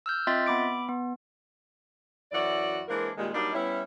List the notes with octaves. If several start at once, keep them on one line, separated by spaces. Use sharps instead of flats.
E6 F6 G6
C4 F4 D#5 E5 C6 A6
B3 B5 D6 D7
B3
F#2 E3 E4 F#4 D5
E3 G#3 A#3 D4 A#4 C5
A#2 D#3 G3 G#3
F#3 G3 A#3 D4 D#4
G3 B3 C#4 E4